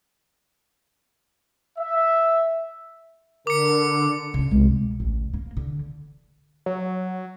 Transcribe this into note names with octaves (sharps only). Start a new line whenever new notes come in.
E5
D3 A#4 D6 C#7
C#3 C#4
C2 G#3
B2
A1 D2
A#3
D3
F#3